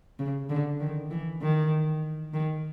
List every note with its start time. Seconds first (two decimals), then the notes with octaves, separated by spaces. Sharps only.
0.19 C#3
0.49 D3
0.80 D#3
1.10 E3
1.41 D#3
2.33 D#3